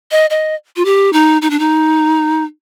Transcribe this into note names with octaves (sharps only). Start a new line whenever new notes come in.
D#5
D#5
F4
G4
D#4
D#4
D4
D#4